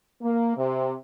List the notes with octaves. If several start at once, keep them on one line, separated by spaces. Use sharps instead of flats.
A#3
C3